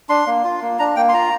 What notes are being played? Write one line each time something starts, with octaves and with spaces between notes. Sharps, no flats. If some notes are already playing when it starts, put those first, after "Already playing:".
D4 C6
A#3
F4
A#3
D4 A#5
A#3 G5
C6
F4 A#5